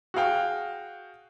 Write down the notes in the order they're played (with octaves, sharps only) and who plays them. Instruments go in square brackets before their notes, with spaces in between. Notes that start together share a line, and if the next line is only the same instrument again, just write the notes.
[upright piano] F#4 G#4 F5 G5